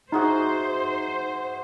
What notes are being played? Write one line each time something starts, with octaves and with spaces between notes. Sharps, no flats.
D#4 F#4 G#4 C5 E5